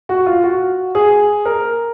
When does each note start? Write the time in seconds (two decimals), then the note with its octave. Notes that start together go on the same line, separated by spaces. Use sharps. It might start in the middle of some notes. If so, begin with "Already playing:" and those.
0.09 F#4
0.26 F4
0.44 F#4
0.95 G#4
1.45 A#4